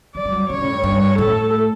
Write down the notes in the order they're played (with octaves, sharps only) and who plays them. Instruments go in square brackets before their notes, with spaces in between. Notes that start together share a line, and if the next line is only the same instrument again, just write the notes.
[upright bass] F#3 [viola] D5
[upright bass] G3
F#3
[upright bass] C#3 [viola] C#5
[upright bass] A2
G2
G2
[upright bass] A2 [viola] A4